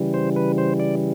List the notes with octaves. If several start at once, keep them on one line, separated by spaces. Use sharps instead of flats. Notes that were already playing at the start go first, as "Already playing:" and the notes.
Already playing: C#3 E3 G3
C5
B4
C5
D5